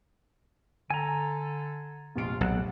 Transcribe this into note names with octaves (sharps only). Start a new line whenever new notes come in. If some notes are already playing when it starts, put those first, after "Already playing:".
D3 A4 G#5 A#5
F1 A#1 G#3 F4 D7
B1 F#5